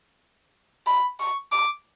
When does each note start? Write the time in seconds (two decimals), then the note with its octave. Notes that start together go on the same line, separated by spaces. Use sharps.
0.86 B5
1.20 C#6
1.52 D6